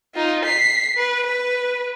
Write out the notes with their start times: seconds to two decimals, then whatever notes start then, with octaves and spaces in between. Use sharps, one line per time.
0.15 D#4 F4
0.45 B6 C7
0.97 B4
1.27 B4